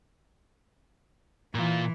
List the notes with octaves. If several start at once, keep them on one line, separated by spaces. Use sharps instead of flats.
A#2 E3 F4